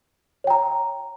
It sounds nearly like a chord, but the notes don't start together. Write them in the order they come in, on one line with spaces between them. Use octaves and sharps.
C#5 G5 A#5